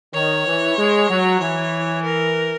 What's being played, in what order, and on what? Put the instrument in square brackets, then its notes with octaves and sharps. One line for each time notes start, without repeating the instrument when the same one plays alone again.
[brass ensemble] D#3 [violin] C#5
[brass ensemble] E3
G#3
F#3
[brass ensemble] E3 [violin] C#5
[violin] A#4